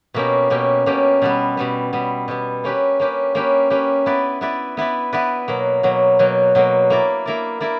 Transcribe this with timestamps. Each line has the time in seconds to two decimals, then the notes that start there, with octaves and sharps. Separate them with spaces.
0.14 B2 A#3 C#4 G4
0.50 B2 A#3 C#4 G4
0.86 B2 A#3 C#4 G4
1.22 B2 G3 B3
1.57 B2 G3 B3
1.93 B2 G3 B3
2.28 B2 G3 B3
2.64 A#3 C#4 G4 B4
3.00 A#3 C#4 G4 B4
3.35 A#3 C#4 G4 B4
3.70 A#3 C#4 G4 B4
4.06 B3 E4 B4 D5
4.41 B3 E4 B4 D5
4.77 B3 E4 B4 D5
5.13 B3 E4 B4 D5
5.48 B2 F#3 A#3
5.83 B2 F#3 A#3
6.19 B2 F#3 A#3
6.55 B2 F#3 A#3
6.90 A#3 E4 A#4 D5
7.26 A#3 E4 A#4 D5
7.60 A#3 E4 A#4 D5